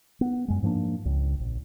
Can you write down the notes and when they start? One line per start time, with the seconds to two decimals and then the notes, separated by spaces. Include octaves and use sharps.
0.21 B3
0.48 F#2 G#3
0.63 G#2 F3 A#3 D4
1.05 C#2
1.40 A#1